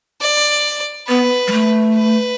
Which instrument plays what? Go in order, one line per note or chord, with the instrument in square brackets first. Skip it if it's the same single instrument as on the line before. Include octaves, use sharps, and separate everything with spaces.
[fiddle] D5
[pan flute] B3 [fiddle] B4
[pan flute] G3
A3
[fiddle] B4